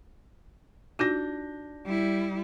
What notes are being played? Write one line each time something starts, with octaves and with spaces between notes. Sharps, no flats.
D4 D#4 F4 F#4 G6 A#6
G3 E4